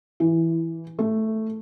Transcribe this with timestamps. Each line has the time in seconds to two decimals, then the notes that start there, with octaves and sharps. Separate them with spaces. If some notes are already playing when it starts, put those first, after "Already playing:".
0.20 E3
0.99 A3